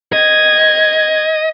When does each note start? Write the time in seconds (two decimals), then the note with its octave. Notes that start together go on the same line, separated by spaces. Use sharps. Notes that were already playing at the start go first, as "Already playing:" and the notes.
0.13 D#5 G#6